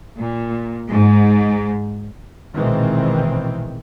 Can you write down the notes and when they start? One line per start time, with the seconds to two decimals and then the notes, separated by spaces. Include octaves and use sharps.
0.18 A#2
0.89 G#2
2.55 A#1 B2 D#3 E3 G#3 C4